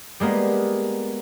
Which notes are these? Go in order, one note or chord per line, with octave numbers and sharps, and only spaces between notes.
G3 G#3 A#3 B3